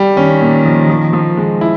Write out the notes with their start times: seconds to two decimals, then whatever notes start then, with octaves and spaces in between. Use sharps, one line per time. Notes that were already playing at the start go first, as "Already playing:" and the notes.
Already playing: G3
0.17 D#3 C#4
0.41 A#2
0.65 F3
0.90 F3
1.13 F3
1.37 G#3
1.61 E4